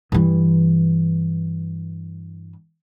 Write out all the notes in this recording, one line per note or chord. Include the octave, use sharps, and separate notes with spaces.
G2 E3